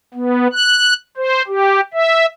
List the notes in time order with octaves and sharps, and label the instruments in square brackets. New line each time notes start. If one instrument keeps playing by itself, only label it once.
[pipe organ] B3
F#6
C5
G4
E5